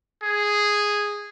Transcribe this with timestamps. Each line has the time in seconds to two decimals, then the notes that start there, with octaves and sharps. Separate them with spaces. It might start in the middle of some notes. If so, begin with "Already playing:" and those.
0.23 G#4